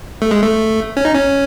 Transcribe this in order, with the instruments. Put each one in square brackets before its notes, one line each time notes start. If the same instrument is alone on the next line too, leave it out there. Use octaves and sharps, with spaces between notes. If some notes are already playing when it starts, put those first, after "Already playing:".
[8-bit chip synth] A3
G#3
A3
C#4
D#4
C#4